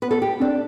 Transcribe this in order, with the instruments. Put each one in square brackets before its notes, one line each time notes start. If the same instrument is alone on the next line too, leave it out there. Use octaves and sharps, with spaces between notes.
[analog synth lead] B3 [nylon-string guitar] B4
[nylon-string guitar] A4
G4
[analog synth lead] C4 [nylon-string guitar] D4